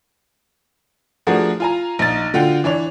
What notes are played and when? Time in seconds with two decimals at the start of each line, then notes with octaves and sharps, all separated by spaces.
1.27 F3 A3 D4 F#4 G#4 A#4
1.60 F4 G#5 A#5
1.99 A#1 D#4 A6
2.34 D3 F4 F#4 F#5 G5
2.64 E3 D4 C#5 F7